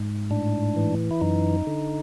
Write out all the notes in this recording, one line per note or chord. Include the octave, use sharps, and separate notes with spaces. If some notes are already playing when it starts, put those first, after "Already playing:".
Already playing: G#2
A2 D4
E3
E4
F#2 D#4
D3